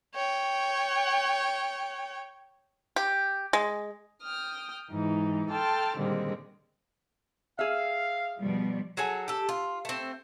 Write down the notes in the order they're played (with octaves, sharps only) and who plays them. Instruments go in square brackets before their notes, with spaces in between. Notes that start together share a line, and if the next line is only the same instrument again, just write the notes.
[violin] C#5 G5
[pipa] G4
G#3
[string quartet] G5 D#6 F6
G#2 E3 D#4
A4 G5 A5 C6 F6
A#2 D3 D#3 G3 G#3 C4
[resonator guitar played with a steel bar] G#4 E5 [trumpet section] F5
[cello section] B2 F3 G3
[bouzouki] F#3 G#4 A4 G#5
G4 A4
F4
A3 C4